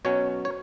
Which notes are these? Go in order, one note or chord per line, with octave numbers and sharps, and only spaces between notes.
B2 F#3 C#4 C#5
C#5